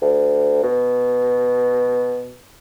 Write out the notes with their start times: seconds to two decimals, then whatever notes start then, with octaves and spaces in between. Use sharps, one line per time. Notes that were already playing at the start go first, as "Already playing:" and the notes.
0.02 D2
0.63 B2